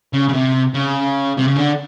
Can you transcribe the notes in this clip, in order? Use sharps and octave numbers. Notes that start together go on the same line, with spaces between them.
C#3
C#3
C3
C#3
C3
C#3
D3